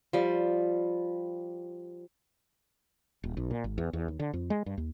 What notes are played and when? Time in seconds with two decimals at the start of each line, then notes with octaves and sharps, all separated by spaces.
0.13 F3 G3
3.24 D#1
3.37 B1
3.51 A#2
3.64 G#1
3.78 E2
3.93 E2
4.08 D#2
4.20 D3
4.33 F2
4.50 G#3
4.66 G2
4.77 D#2